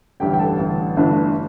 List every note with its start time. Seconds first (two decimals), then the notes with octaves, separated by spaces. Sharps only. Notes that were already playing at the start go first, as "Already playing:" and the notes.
0.20 A1 G2 D3 G4 G5
0.34 G5
0.39 A4 A5
0.59 A1 G2 D3
0.97 G1 G2 E3 A3 D4